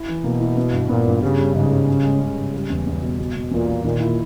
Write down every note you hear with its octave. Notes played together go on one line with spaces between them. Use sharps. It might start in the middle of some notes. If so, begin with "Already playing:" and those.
Already playing: E4
E3
B2 A#3
E4
B3
G2
A#2 B3
G2
C#3 G3
G3
G#2 C#3
G3
C#4
G#3
C#4
C#3
G3
E2
E2
B2
B2
B2
E2 A#2
A#3
A#2 D#3
E4